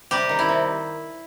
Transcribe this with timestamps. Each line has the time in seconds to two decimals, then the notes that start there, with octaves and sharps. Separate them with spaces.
0.11 C3 G3 G4
0.29 D#3
0.39 E4
0.49 C3